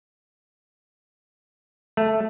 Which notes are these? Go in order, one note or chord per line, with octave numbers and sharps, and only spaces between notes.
A3